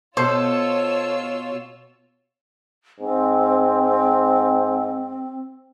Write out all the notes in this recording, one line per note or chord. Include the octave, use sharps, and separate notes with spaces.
B2 F4 A4 C5 C#5 E6
G#2 C4